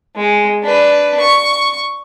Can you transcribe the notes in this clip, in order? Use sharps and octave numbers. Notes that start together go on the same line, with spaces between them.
G#3
D4 B4
C#6